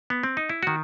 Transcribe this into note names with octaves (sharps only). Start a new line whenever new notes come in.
B3
C4
D#4
E4
D#3 F#4